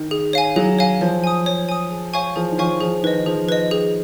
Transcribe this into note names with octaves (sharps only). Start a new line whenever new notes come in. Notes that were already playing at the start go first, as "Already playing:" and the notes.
Already playing: D#3
G#4
C#5 F5 G#5
F#3 G#4
C#5 F5 G#5
F3 C#5
G#5 D#6
C#5
G#5 D#6
G#4
C#5 F5 G#5 C#6
F3 G#4
D#3
F3 C#5 F5 G#5 C#6
F3 G#4
D#3 B4 D#5
F3 G#4
B4 D#5
G#4